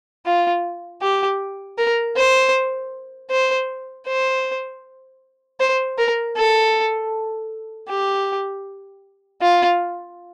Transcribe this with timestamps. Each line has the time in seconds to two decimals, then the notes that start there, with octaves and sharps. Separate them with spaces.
0.26 F4
1.02 G4
1.78 A#4
2.17 C5
3.31 C5
4.08 C5
5.60 C5
5.98 A#4
6.37 A4
7.89 G4
9.42 F4